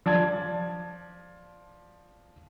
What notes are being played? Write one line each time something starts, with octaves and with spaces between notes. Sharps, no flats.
F3 D5 A5 G#6